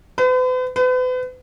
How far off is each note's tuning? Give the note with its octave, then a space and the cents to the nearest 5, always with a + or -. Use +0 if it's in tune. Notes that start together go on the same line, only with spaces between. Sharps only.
B4 +45
B4 +40